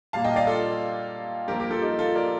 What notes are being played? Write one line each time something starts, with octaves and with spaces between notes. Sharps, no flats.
A#2 G3 A#3 F5 A5
D#5 G5
D5 F5
F4 A4
G2 F3 A#3 G4 A#4
G4 A#4
F4 A4
D#4 G4
F4 A4
A#4 D5